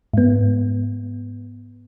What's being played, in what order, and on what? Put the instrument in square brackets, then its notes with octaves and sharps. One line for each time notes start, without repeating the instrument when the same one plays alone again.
[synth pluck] G#2 B3